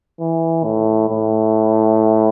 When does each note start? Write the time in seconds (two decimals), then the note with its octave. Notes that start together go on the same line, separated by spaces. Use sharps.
0.20 E3
0.64 A2
1.10 A2